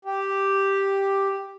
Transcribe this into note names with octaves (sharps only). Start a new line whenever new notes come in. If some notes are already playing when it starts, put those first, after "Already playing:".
G4